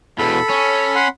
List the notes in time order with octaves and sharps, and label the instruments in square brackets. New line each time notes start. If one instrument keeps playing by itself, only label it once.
[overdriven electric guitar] E2 B2 [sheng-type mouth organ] A4 B5
[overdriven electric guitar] C#4
[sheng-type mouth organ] F#5 B5 C6